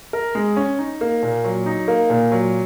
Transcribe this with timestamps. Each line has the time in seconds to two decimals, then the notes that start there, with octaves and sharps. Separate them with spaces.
0.13 A#4
0.35 G#3
0.57 C#4
0.79 D#4
1.01 A#3
1.23 A#2
1.45 F#3
1.66 D#4
1.88 A#3
2.10 A#2
2.32 F#3